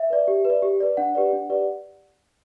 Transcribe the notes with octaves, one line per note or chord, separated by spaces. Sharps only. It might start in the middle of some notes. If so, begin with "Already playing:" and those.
Already playing: E5
B4 D5
G4
B4
D5
G4
B4 D5
D4 F#5
G4 B4 D5
D4
G4 B4 D5